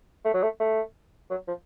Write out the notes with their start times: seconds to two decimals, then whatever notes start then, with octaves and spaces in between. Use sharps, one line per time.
0.25 A3
0.34 F#3
0.43 A3
0.60 A3
1.30 F#3
1.48 F3